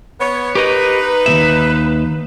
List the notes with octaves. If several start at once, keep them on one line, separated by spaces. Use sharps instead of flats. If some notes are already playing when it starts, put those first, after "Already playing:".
B3 C#5
D#4 G4 A#4 B4 D#5
D#2 A#2 E5